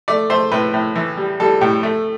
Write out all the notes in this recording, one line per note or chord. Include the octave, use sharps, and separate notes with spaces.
A3 D5
A3 C5
A2 B4
A2
E3
G3
G3 A4
A2 G4
A3